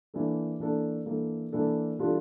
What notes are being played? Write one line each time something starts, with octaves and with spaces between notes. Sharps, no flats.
E3 A#3 D4 A4
E3 A#3 D4 A4
E3 A#3 D4 A4
E3 A#3 D4 A4
E3 G3 D4 F4 A4